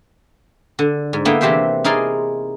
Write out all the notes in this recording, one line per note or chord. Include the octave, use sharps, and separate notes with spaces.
D3
G#2
D3 A#3 B3 E4 G5
C3 E3 G4 C5 E5 G5
D#4 E4 G#4 A#4 D5 C6